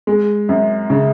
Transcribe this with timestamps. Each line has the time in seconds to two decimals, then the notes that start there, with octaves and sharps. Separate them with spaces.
0.07 G#3
0.49 F#2
0.90 C#3